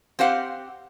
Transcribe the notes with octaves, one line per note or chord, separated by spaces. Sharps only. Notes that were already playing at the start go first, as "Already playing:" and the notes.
C4 G4 C5 F5 F#5